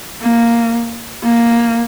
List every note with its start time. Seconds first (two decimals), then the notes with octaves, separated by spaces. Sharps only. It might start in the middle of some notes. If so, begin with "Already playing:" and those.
0.22 A#3
1.24 A#3